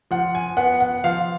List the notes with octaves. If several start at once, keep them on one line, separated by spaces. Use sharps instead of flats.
F3 F#5
G#5
B3 F#5
F#5
F3 F5